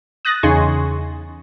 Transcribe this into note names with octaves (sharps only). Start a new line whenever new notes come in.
D#6 F#6 A6 A#6
E2 C#3 D#4 G#5 C6 C#6